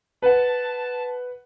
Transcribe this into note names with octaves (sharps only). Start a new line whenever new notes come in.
B4 F#5 A5